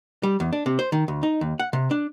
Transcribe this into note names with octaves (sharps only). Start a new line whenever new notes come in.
G3
E2
D4
C3
C5
D#3
D2
D#4
D#2
F#5
C3
D4